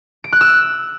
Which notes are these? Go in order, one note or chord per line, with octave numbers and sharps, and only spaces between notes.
D7
F#6
E6